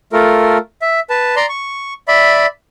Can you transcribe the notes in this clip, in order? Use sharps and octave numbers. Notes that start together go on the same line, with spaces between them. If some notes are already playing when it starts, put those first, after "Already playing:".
A3 F4 A4 A#4
E5
B4 A5
D5 A#5 C6
C#6
D5 E5 B5